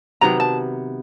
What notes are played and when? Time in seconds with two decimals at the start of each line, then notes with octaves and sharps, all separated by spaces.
0.21 C3 D#3 F#3 B3 A#5
0.40 A5